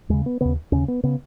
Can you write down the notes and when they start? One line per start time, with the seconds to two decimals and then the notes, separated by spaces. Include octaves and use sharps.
0.09 D#2 C#3 G#3
0.26 B3
0.41 D#2 C#3 B3
0.72 D#2 C#3 C#4
0.88 B3
1.04 C#3 B3